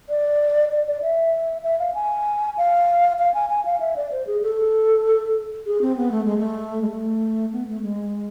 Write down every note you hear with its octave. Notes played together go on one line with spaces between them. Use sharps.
D5
D5
D5
E5
E5
F5
G#5
F5
F5
G#5
G#5
F5
E5
D5
C5
G#4
A4
G#4
C4
B3
A3
G#3
A3
G#3
A3
B3
A3
G#3